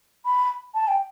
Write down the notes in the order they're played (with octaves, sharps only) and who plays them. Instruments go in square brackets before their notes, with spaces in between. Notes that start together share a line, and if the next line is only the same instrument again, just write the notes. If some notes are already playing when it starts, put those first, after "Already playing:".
[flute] B5
A5
G5